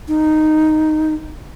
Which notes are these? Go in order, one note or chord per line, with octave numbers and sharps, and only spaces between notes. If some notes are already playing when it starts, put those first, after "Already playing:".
D#4